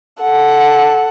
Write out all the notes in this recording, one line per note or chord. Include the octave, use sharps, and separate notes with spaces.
A4 F#5